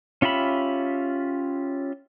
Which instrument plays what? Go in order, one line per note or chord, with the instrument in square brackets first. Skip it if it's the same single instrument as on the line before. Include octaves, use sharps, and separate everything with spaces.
[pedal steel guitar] C#4 F4 G4 E5 B5